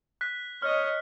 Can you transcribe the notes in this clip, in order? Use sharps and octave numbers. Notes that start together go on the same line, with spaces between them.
F#6 B6
C#5 D#5 F6